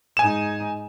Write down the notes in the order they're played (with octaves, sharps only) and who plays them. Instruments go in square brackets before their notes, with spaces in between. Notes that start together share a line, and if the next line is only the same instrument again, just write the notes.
[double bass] G#2 D#4 [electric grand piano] G#5 E7